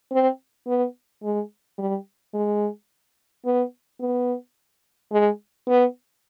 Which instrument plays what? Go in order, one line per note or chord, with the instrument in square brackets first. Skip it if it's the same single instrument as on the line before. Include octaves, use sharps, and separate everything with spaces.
[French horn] C4
B3
G#3
G3
G#3
B3
B3
G#3
B3